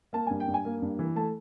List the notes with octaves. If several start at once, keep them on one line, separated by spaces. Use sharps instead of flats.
A#3 A5
G2 G#5
G5
G2
G#5
A#3
G2
E3
A3 A5